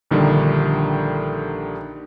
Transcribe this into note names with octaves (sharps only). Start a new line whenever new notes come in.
A#1 D3 D#3 G3